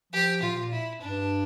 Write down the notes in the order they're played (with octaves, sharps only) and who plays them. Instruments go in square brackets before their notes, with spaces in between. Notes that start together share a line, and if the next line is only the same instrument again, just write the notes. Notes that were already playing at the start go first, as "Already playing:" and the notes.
[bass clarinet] F3 [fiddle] G4
[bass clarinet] A#2 [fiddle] F4
[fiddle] E4
[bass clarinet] G2 [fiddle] D4